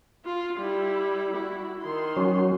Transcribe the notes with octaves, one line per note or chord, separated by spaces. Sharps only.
F4
G3 E4
E4 F#4
D#3 C6
F#3 C#4 F#4